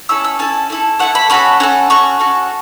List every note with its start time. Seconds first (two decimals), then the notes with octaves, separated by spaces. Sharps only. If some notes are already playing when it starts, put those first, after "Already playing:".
0.09 C#4 E4 A4 E6
0.24 E6
0.39 C#4 E4 A4 A5
0.70 A3 E4 A4
0.99 A3 E4 A4 F#5
1.15 B5
1.30 C#4 F#4 A4 B5
1.60 C#4 F#4 A4
1.90 C#4 F#4 A4 C#6
2.19 C#4 F#4 A4